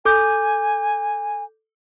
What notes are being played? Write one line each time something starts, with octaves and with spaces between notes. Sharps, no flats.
A4 G#5 D6 G6